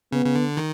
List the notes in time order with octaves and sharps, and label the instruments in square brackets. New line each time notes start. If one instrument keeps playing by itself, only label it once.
[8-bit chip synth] C#3 [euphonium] B3
[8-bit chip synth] C#3
D3
D#3